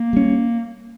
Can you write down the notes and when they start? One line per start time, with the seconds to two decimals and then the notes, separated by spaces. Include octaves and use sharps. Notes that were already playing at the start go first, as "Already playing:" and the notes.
Already playing: A#3
0.13 G3 C#4